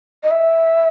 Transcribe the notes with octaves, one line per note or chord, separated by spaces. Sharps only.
D#5
E5